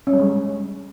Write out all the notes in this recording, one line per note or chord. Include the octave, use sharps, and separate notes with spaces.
C#4
G3
G#3